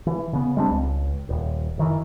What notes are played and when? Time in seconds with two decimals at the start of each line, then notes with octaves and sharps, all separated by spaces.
0.07 E3
0.33 C#3 B3
0.57 G3 G#3 C4 D4
0.70 C#2
1.29 D#1
1.78 F#1 D#3 E3